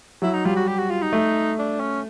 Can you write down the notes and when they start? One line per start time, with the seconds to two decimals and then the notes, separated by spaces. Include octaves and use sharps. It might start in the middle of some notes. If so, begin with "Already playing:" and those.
0.22 F#3 E4
0.34 D#4
0.45 G3 F4
0.56 F#4
0.67 G4
0.78 F#4
0.90 F4
1.02 D#4
1.13 A3
1.59 D4
1.80 C#4